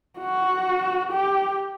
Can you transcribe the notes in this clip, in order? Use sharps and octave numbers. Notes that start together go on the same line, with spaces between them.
F#4
G4